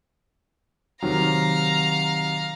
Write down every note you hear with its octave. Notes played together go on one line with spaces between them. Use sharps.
C3 D#3 F#3 F5 A#5